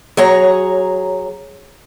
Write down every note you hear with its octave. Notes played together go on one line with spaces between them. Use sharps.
F#3 G#4 C#5 A#5